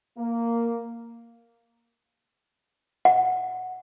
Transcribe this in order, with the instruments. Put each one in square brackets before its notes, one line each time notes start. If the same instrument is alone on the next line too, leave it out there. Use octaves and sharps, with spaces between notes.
[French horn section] A#3
[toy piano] F#5